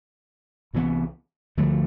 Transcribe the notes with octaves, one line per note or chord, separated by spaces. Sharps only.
C2 C3 E3 B3
D2 D3 F3 A3